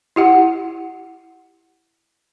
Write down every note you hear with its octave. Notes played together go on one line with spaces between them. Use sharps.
E4 G4 F#5